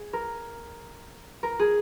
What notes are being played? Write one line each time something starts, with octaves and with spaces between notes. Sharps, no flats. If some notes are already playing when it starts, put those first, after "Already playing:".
Already playing: G#4
A#4
A#4
G#4